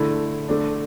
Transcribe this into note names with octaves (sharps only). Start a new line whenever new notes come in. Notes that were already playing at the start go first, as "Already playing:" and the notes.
Already playing: D3 A3 E4
D3 A3 D4